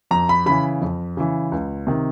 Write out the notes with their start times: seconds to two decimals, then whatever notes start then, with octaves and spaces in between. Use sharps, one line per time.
0.11 F2 A#5
0.29 B5
0.46 C#3 E3 B5
0.81 F2
1.17 C#3 E3
1.52 C#2
1.87 C3 D#3